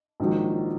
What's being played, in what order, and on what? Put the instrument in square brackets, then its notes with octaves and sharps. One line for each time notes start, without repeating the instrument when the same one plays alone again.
[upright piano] A#1 G#2 D#3 F#3